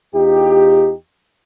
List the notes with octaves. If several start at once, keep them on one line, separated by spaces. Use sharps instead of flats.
E2 D#4 F4 G4